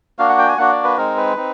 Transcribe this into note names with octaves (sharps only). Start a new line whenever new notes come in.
A#3 D4 F#4 F5
F#5
G5
G#5
A#3 D4 F#4 F#5
D5
B4
G#3 C4 D#4 A#4
B4
C4 D#4